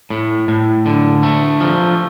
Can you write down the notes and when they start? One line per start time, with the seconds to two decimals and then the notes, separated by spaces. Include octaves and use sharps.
0.10 A2
0.48 A2
0.86 D3
1.23 A3
1.61 F3